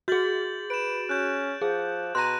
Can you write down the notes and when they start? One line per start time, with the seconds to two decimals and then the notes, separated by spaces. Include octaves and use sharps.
0.08 F#4 G#4 G6 A6 F#7
0.70 B4 D7 E7
1.09 C#4 F#6 G6 E7
1.61 F3 G#4
2.15 B2 A#5 C6 F#6 A#6 D#7